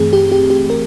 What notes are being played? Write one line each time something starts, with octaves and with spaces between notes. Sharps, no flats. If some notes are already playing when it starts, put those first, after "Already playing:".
Already playing: G2 E3 A3 C4 G#4
G4
G4
G4
A#4